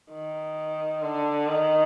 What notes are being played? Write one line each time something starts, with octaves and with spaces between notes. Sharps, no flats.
D#3
D3
D#3